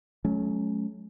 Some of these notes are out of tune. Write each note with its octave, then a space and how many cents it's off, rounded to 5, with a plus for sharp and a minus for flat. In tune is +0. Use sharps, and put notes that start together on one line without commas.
F#3 -15 A3 -45 C#4 +0